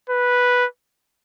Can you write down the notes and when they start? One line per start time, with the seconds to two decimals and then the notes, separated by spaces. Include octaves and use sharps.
0.10 B4